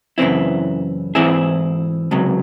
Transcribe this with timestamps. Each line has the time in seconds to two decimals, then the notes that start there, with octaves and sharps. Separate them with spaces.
0.18 F#2 C#3 E3 C4 E4
1.15 G#2 E3 C4 E4 G#4
2.11 C#2 C3 F#3